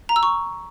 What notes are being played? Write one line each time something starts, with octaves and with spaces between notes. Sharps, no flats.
A#5
E6
C#6